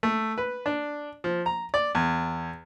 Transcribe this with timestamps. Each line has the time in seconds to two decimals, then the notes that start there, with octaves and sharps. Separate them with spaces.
0.03 A3
0.38 B4
0.66 D4
1.24 F3
1.46 A#5
1.74 D5
1.95 E2